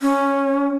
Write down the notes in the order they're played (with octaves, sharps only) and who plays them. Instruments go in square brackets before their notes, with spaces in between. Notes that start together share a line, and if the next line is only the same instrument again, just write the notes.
[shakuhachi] C#4